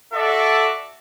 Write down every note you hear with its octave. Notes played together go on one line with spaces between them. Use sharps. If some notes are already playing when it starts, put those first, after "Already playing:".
F#4 A4 D5 E5